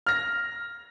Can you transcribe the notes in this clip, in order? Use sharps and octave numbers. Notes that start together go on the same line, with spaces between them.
F6 A#6